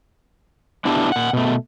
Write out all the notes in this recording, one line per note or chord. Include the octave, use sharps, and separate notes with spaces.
B3 D4 E4 F4 G4 A5
A#2 F#5
B2 A3